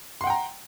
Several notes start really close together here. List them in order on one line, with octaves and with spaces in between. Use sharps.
C6 F#5 G5 A#5